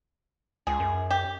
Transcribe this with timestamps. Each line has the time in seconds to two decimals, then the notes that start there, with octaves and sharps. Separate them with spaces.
0.67 C#2 G#4
0.80 F#2
1.10 G4